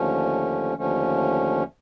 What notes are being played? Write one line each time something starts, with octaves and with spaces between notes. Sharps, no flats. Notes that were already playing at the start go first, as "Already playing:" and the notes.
Already playing: D#2 D3 F3 A3 C#4
D#2 D3 F3 A3 C#4